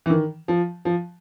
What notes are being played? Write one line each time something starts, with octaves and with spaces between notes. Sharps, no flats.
E3
D#3
F3
F3